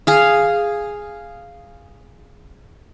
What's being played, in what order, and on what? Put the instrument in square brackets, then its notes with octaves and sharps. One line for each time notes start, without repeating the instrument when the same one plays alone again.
[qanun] G#4 F5